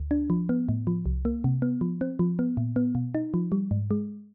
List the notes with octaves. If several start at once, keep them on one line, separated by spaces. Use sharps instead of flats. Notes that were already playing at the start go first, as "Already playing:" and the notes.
Already playing: D2
D4
F3
B3
A2
F3
C2
A#3
C3
B3
F3
C4
F3
B3
A#2
B3
B2
D#4
F3
G3
G#2
G#3